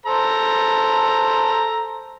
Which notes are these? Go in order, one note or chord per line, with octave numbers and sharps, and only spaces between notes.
A4 C5 A#5